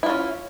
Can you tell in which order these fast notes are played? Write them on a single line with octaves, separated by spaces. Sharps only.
E4 F4 C#4